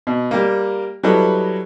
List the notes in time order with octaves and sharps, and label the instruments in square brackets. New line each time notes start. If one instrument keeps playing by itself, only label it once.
[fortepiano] B2
G3 A#3
F#3 G3 E4 A4 B4 D#5